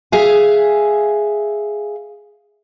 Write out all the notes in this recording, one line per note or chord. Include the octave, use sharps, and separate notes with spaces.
G#4 E5 F5 G#5